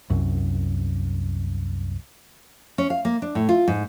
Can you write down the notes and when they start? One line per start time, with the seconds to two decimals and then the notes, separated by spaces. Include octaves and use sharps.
0.10 C2 F#2
2.78 C#4
2.90 F5
3.05 A#3
3.22 D4
3.35 A2
3.49 F4
3.68 G#2